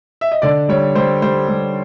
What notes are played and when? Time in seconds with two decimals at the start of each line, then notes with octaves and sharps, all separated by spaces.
0.21 E5
0.32 D#5
0.42 D3 D5
0.69 G3 C#5
0.95 G3 C5
1.22 G3 C5
1.49 G3